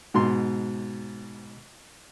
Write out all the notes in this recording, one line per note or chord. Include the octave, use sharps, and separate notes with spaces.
G#2 B2 C6